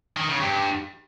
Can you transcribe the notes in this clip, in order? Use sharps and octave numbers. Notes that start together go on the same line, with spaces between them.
D#3
C#3
G2